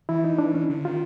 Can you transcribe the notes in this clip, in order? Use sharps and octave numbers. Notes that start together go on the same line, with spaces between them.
E3 E4
D#4
D4
C#4
D3
D#3 F4